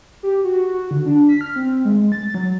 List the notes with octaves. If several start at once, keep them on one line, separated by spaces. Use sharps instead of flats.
G4
F#4
F#4
D3
D4
B6
F6
C4
G#3
A6
F#3